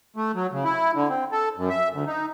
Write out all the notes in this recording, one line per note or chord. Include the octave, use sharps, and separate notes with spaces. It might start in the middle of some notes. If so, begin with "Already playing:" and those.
A3
F#3
C#3
E4
D3
C4
A4
F#2
E5
D2
D#4